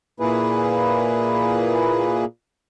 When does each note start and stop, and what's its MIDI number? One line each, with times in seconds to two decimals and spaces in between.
0.20 2.25 46
0.20 2.25 58
0.20 2.25 64
0.20 2.25 68
0.20 2.25 71